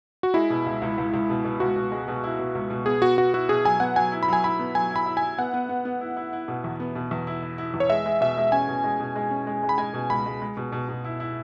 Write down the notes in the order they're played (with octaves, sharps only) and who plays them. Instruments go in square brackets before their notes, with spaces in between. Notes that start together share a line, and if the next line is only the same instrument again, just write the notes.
[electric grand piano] F#4
[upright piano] G#3 [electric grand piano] E4
[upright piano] B2
C#2
C#2
C#2
C#2
B2
B2
[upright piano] C#2 [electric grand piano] F#4
[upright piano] B2
G#3
B2
E4
B2
C#2
B2
[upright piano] B3 [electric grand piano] G#4
[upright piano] B3 [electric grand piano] F#4
[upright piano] B3 [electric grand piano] F#4
[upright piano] E4 [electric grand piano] F#4
[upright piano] B2 [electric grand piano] G#4
[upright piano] F#3 [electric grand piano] G#5
[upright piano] B3 [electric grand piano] F#5
[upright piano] F#3 [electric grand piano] G#5
[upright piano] E4
[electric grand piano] B5
[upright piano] F#3 [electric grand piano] G#5
[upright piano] E4 [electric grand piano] B5
[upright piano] B3
[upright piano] F#3 [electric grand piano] G#5
[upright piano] E4 [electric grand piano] B5
[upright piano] E4
[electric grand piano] G#5
[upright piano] E4
[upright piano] B3 [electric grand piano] F#5
[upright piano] B3
B3
B3
E4
E4
E4
B2
E2
B3
B2
E2
E4
E4
E4
E2
[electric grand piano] C#5
[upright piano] G#3 [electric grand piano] E5
[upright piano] G#3
[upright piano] B2 [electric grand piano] E5
[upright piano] G#3
[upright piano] C#4 [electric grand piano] G#5
[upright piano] B2
G#3
B2
G#3
C#4
G#3
G#3
[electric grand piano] B5
[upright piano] G#3 [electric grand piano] G#5
[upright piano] B2
[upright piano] C#2 [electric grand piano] B5
[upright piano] G#3
G#3
B2
B2
B2
E4
E4